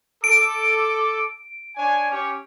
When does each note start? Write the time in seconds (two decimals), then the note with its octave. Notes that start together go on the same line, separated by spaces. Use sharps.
0.24 A4 D6 D7
1.77 D4 C#5 G#5
2.11 C#4 G4 C#5